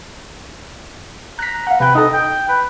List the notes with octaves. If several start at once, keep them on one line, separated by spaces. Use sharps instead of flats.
A#5 F#6 B6
F5 F#5
C3 B4 G5
D#4 A4 D#5
G5
B4